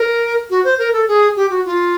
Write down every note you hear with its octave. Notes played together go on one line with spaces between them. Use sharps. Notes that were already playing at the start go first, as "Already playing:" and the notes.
Already playing: A#4
F#4
C5
A#4
A4
G#4
G4
F#4
F4